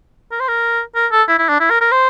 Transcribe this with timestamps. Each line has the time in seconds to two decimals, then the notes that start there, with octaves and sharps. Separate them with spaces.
0.31 A#4
0.40 C5
0.48 A#4
0.96 A#4
1.12 A4
1.28 E4
1.38 E4
1.49 D4
1.60 E4
1.70 A#4
1.81 A#4
1.92 C5